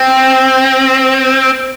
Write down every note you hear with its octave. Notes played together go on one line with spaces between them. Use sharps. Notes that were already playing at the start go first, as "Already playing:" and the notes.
Already playing: C4